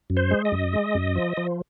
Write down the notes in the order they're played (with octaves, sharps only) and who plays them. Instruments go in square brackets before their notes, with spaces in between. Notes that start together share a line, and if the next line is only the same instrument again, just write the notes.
[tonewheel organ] F#2
C5
G#3
D#5
F#2
G#3
F#2
F3
F3